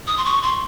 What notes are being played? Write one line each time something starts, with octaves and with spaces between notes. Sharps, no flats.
D#6
C6
C#6
C6